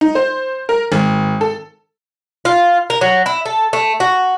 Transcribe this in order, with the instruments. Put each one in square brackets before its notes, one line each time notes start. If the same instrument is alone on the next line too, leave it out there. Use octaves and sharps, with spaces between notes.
[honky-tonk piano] D#4
C5
A#4
G#1
A4
[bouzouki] F4
A#4
F#3
E4
A4
A3
F#4